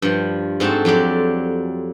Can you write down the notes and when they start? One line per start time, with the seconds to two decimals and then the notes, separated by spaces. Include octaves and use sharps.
0.02 G2 F3
0.60 G#2 C4 F#4 A4 A5
0.85 F2 F#3 G4 D5